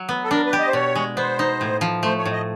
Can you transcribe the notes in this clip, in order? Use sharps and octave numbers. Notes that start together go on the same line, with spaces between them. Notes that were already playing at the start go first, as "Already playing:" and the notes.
Already playing: F#3
B3
A4
D4 A#4
B4
G4
D#5
C5
B2 C#5
G#3
B3 C5
D#4
A2
F3
A3 C5
C#5
A2
D#5